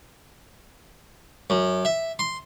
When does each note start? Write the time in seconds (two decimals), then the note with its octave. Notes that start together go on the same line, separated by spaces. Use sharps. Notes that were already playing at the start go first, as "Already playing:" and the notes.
1.50 F#2
1.85 E5
2.19 C6